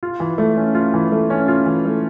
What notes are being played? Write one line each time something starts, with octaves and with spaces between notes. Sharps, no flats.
F4
E3
A3
C#4
F4
E3
A3
C#4
F4
E3
A3